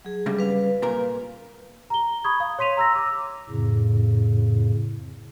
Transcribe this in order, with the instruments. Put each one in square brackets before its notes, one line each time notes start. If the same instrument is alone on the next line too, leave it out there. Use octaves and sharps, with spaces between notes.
[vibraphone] F#3 G#4
[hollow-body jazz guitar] G2 C#3 G3
[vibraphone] B4 F5
[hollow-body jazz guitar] A#2 A#4
[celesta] A#5 G7
B5 C#6 D#6 G#6
F5
C#5 C6 B6 D#7 F7
A#5 E6 A#6
D6 E6
[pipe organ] F2 A2 C#3